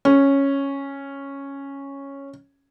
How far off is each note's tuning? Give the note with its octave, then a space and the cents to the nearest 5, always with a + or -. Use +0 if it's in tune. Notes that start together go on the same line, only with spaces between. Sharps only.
C#4 -5